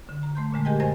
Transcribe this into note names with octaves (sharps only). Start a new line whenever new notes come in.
D3
A#5
A3 C6 G6
A#2 D3 G#3 A3
G4 G#4 A#4 D#5 G5 G#5
F#2 C5 D#5 G#5 A#6